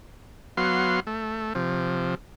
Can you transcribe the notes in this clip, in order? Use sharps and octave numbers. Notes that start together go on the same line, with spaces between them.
F#3 B3 F5 C6
A3
C3 F3